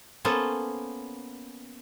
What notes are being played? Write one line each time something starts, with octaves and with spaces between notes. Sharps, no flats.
A#3 B3 C#4 A4 C5